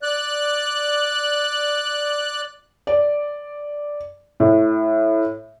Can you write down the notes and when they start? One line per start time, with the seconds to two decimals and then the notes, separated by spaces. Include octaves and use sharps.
0.02 D5 F#6
2.87 D5
4.40 A2